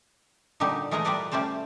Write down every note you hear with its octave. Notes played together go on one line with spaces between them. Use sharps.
A#2 D3 G3 D#4 G4
E3 G#3 A3 G#4 A#4 A#5
G3 F4 A#4 B4 D5 F#5
G3 A3 C#4 C5 D5